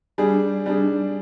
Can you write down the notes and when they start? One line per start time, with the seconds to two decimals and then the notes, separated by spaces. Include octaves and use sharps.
0.18 G3 D4 G#4
0.66 G3 D4 G#4